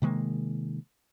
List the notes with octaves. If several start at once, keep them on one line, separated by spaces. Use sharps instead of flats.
C3 D#3 G#3 A#3